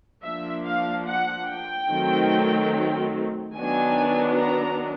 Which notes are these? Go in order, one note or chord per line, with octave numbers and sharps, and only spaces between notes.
F3 A#3 D4 E5
F5
F#5
G5
D#3 F#3 A3 C4
D#3 F#3 B3 D4 G#5
A#5